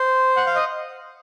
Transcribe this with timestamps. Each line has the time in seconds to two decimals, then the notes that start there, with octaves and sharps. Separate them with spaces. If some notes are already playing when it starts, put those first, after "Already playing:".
Already playing: C5
0.37 F#5
0.46 F5
0.55 D#5